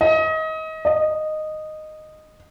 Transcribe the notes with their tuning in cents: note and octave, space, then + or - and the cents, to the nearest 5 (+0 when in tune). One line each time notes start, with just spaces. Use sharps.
D#5 +30
D#5 -10